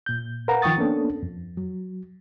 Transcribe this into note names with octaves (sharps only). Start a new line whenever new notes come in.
A#2 G6
A#4 B4 F5 F#5 A#5
D#3 F3 G5 C#6 D#6 A6
A#3 B3 C#4 D4 A4
F2
F#3